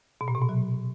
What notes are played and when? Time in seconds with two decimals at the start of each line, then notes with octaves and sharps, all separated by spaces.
0.21 B2
0.28 A#2
0.35 C3
0.42 B2
0.49 F#3